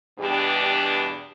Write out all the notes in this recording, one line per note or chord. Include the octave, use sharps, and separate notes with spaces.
E2 G2 B2 D4 G4